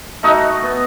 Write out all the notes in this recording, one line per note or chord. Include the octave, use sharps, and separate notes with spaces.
A3 D#4 F#4 D#5
B3